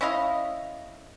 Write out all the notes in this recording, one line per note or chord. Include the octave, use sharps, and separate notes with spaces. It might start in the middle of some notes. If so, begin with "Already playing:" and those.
C#4 E4 D#5 F5